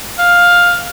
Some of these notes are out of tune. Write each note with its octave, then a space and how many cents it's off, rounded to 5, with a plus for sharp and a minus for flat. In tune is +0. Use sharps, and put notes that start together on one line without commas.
F5 +10